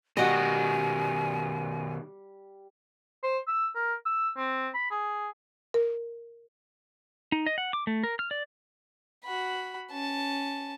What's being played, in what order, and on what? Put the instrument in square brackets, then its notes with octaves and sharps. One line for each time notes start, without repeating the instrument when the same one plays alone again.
[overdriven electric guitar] B2 D#3 [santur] G3 [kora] F#4 D#5 [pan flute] G#5
[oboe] C5
E6
A#4
E6
C4
B5
G#4
[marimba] A#4
[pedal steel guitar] D#4
D#5
F#5
D6
A3
A#4
F6
D5
[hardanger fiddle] F#4 B5
C#4 A5